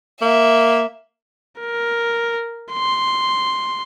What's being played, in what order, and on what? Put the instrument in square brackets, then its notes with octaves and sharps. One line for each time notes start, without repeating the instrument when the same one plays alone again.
[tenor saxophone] A#3 [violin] E5
[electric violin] A#4
C6